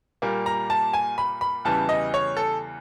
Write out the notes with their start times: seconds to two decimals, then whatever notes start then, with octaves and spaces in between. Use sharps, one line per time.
0.22 A#2 G3 A#3
0.46 A#5
0.70 A5
0.93 G#5
1.18 B5
1.41 B5
1.65 E2 C#3 E3 G3 A5
1.89 D#5
2.14 C#5
2.37 A4